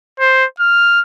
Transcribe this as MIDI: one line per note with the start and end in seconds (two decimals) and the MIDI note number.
0.20 0.45 72
0.60 1.01 89